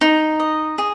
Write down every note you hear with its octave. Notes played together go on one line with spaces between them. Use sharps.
D#4
D#5
G#4